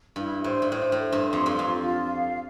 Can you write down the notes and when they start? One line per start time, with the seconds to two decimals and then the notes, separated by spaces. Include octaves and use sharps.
0.16 G2 E4
0.44 A2 C5
0.62 G2
0.71 A2 C5
0.92 A2
0.99 C5
1.12 G2
1.27 C6
1.33 F2
1.46 G2
1.54 F2 F4
1.81 F4
2.09 F5